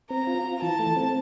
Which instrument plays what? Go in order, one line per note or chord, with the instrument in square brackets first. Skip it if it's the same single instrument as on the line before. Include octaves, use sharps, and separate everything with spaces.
[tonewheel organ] C4 [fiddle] A#5
[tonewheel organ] F4
F4
[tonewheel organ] E3 [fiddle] A5
[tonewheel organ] A3
C4